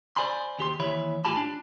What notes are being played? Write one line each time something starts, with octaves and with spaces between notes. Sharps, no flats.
C5 D5 G#5 B5 C6
D#2 G4 C6
D#2 E3 C#5 E5 B5
A2 F4 G4 G#5 A5 B5
D4